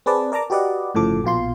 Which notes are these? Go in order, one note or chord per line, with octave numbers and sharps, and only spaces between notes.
C4 G#4 B4 D5 A5
A#4 D5 A5 A#5 D6
F#4 G4 B4 D5 D#5 F#5
G1 A2 C#3 F3 A4 D6
A#1 B2 F4 C6